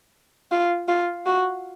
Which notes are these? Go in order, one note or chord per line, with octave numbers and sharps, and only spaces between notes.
F4
F4
F#4